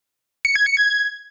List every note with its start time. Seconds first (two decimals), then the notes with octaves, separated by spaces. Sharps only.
0.45 C#7
0.56 G#6
0.66 C#7
0.77 G#6